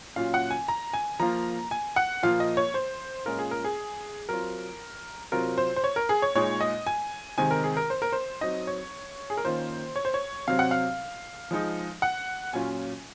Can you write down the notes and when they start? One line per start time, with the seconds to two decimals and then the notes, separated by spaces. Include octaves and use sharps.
0.16 A#2 F#3 C#4 F4 F5
0.34 F#5
0.50 G#5
0.68 A#5
0.93 G#5
1.20 F3 A#3 F4 A#5
1.71 G#5
1.96 F#5
2.23 A#2 F3 A#3 F4 F5
2.40 D#5
2.57 C#5
2.74 C5
3.26 A#2 G#3 C#4 F4 A#4
3.39 G#4
3.51 A#4
3.65 G#4
4.29 F#3 C4 F4 A#4
5.32 C3 F#3 C4 F4 A#4
5.58 C5
5.76 C5
5.84 C#5
5.96 A#4
6.09 G#4
6.22 C#5
6.35 A#2 G#3 D#4 C#5
6.61 D#5
6.87 G#5
7.38 C3 D#3 G#3 C4 G#5
7.51 A#4
7.64 G#4
7.77 A#4
7.90 C5
8.02 A#4
8.13 C5
8.41 F#3 C4 D#4 D#5
8.67 C#5
9.30 G#4
9.37 A#4
9.45 D#3 A#3 C#4 F4 C5
9.96 C#5
10.05 C5
10.14 C#5
10.48 C3 F#3 C4 F5
10.59 F#5
10.71 F5
11.51 F3 G#3 D#4
12.02 F#5
12.53 A#2 F#3 C#4 F4 G#5